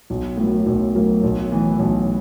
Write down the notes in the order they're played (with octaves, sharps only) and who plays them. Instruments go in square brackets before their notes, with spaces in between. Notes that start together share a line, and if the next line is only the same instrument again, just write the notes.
[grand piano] B1
A2 F#3 A#3
B1
A2 F#3 A#3
B1
A2 E3
B1